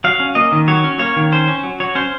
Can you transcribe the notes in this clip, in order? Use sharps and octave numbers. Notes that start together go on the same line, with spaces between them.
F#3 F5
C#4
A#3 D#5
D#3
F#3 C#5
C#4
A#3 C#5
D#3
C#4 C5
C#4
F#3
F#3 C#5
C#4 C5